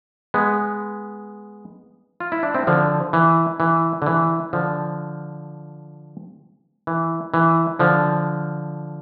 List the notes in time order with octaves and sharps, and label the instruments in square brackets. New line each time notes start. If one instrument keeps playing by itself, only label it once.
[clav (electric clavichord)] G#3 B3
F4
E4
D4
C4 E4
D3 F3
E3
E3
D3
E3
D3 F3
E3
E3
D3 F3